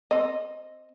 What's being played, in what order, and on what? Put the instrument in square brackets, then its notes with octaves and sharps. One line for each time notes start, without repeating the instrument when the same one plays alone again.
[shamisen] C4 D#5